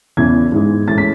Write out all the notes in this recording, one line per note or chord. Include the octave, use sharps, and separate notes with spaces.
E2 C#3 E3 G#6
G#2 E3 G#3
A2 E3 G#3 C#4 A6
B6